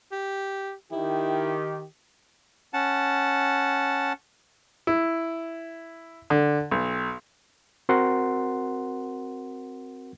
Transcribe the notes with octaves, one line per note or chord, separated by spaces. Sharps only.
G4
D#3 E4 G4
C#4 F#5 A5
E4
D3
B1
C4 F#4 A#4 F#5 C6